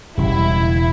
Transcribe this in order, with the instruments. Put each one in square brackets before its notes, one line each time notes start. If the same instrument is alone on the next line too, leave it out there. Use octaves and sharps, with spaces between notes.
[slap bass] E1 [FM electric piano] C#3 G3 [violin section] E4